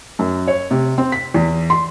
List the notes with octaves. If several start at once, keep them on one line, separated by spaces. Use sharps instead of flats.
F#2
C#5
C3
C4
B6
E2
C6